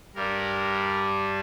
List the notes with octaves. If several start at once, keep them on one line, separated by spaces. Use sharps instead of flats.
G2 G3 D4 A#4